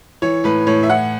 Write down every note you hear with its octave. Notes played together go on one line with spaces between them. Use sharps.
E3 C#5
A2 B4
A2 C#5
E5
E3 F#5